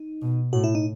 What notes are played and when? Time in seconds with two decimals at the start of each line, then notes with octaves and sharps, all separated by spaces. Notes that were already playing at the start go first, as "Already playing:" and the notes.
Already playing: D#4
0.22 B2
0.53 A2 F#4
0.64 E4
0.75 D#4